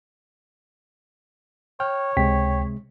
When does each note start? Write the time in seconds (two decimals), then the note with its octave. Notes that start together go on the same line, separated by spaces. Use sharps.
1.80 C#5 G5 F6
2.17 C#2 C3 G#3 G5 B6